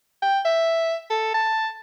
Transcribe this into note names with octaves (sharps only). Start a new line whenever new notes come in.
G5
E5
A4
A5